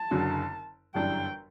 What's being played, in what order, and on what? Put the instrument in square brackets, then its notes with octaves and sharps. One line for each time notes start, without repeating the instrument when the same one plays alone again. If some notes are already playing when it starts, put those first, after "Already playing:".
Already playing: [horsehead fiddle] A5
[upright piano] F#1 F#2 D3 F#3
[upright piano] G1 F#2 E3 G3 D4 [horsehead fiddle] G5